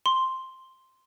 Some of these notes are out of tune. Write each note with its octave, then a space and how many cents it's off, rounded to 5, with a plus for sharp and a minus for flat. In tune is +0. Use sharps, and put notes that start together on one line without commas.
C6 +0